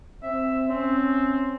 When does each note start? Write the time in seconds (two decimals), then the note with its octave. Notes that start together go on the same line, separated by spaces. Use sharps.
0.23 C4 E5
0.69 C4 C#4